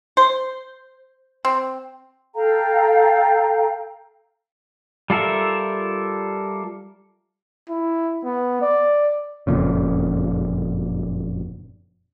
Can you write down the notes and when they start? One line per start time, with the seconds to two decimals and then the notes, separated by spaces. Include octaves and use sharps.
0.17 C5
1.45 C4
2.34 A4 F5 G5 A#5
5.10 G3 F4 A4 A#4 E5
7.70 E4
8.24 B3
8.62 D5
9.47 F#1 F2 A#2 C#3